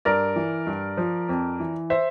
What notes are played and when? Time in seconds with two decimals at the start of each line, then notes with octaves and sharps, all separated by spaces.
0.05 G2 A#4 D5
0.36 E3
0.67 G2
0.97 F3
1.29 F2
1.60 E3
1.90 C5 E5